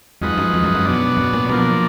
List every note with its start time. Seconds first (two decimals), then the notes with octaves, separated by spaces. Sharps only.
0.22 F2 F3 G#3 D#4 F#4 B4
0.38 F#2
0.54 F2
0.64 F#2
0.75 F#2
0.85 B2 F#3 B3 D4
1.17 F#2
1.33 A#2
1.49 B2 F3 A#3 D4